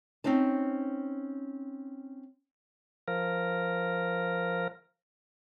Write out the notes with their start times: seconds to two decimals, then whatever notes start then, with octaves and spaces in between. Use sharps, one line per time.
0.24 C4 C#4 D#4 C5 A5
3.08 F3 A#4